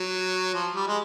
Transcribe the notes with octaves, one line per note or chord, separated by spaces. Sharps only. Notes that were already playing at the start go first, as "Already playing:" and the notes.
Already playing: F#3
F3
G3
G#3